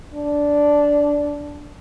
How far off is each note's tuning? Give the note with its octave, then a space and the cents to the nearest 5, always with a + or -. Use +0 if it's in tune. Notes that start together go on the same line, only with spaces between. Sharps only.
D4 -10